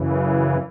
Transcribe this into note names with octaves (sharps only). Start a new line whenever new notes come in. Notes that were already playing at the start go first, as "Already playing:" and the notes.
Already playing: F#2 C#3 E3